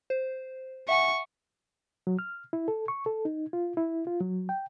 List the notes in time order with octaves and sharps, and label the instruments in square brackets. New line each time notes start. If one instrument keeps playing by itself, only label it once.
[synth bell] C5
[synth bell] E5 F#5 G#5 [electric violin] C#6
[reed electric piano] F#3
F6
E4
A4
C#6
A4
D#4
F4
E4
F4
F#3
G5